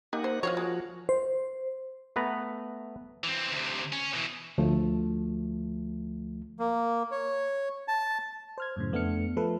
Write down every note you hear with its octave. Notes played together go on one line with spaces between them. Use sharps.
A#3 D#4 G4 F#5
C5
F3 F4 F#4 C5 C#5
G#3
C5
A3 B3 B4 A#5
E3 C4
D2 C3
C#4
B2 E3
D2 F3 A3
A#3
C#5
A5
C5 F6 G#6
F#2 A2 C#3
F2 A3 B3 D4 F6 C#7
F3 A3 A4 B4